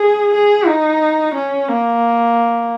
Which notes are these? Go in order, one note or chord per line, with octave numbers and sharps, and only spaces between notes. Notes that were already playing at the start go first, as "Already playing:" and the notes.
Already playing: G#4
G#4
D#4
C#4
A#3